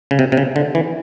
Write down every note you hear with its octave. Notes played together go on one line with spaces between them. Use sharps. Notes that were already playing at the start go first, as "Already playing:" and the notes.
C#3
C3
C3
C#3
D3
E3